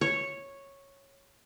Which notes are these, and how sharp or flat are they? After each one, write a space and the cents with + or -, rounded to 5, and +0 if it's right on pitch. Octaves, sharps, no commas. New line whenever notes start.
C#5 -5